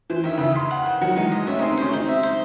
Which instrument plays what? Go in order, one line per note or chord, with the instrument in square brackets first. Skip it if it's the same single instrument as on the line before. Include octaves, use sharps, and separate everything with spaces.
[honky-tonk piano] E3 [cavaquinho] C5
[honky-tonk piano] D#3 [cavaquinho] E5
[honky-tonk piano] C#3 E3 [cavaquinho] E5
[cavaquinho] C6
F#5
C5
[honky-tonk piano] D#3 F#3 [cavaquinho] F#4
[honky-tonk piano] E3 G#3 [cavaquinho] D#4
[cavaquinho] D#5
[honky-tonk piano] A3 C#4 [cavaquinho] E5
[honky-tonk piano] C4 D#4 [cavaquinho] C6
[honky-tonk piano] A3 C#4 [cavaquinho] C5
[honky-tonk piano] C4 D#4 [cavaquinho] C5
[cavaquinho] E5
C5